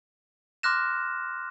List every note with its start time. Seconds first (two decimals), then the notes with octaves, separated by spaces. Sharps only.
0.63 C6 D6 F6 F#6 A#6 E7